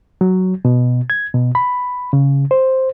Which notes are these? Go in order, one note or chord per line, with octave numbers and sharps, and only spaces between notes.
F#3
B2
G#6
B2
B5
C#3
C5